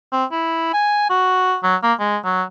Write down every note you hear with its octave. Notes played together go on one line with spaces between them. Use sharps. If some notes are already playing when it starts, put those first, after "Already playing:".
C4
E4
G#5
F#4
F#3
A#3
G#3
F#3